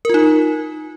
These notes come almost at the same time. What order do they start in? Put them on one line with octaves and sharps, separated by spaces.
A#4 F4 D#4